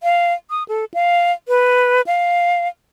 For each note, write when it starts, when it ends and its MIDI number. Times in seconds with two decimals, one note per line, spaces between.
0.03 0.33 77
0.50 0.63 87
0.69 0.85 69
0.94 1.32 77
1.48 2.01 71
2.07 2.68 77